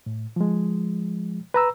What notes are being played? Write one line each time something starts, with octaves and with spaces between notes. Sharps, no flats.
A2
F3 G#3
B4 A#5 E6